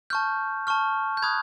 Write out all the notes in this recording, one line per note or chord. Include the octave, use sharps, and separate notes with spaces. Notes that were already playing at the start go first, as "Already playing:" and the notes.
A5 C#6 F6 G6
A5 C#6 F6
G6
B5 D#6 F#6 G#6